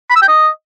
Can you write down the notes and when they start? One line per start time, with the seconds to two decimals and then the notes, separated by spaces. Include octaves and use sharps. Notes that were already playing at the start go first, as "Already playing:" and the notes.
0.10 B5
0.16 E6
0.22 G5
0.28 D#5